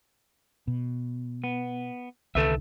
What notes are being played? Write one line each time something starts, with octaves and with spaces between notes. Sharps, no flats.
B2
B3
C2 D3 D#3 A4 B4 E5